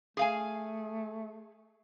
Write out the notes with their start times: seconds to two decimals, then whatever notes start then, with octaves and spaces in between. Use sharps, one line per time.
0.17 A3 G#4 F5 G#5